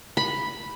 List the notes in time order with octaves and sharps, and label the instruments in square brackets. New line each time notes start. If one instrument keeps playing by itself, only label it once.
[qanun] B5